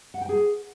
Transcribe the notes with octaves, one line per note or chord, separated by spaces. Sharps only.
F#5
G5
G#4